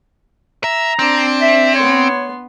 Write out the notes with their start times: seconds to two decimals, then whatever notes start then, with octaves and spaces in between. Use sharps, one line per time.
0.64 E5 A#5
0.99 C4 D4
1.41 E5
1.75 B3 C#5 C6